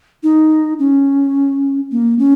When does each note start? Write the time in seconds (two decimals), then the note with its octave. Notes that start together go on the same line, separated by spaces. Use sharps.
0.23 D#4
0.79 C#4
1.92 A#3
2.19 C#4